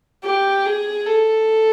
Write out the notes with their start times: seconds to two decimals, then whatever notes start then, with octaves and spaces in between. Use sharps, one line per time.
0.24 G4
0.66 G#4
1.07 A4